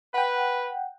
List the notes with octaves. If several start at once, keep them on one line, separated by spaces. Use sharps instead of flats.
B4 F#5 G5